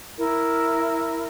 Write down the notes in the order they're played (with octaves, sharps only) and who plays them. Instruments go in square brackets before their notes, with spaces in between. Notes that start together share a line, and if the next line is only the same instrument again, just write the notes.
[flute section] E4 A#4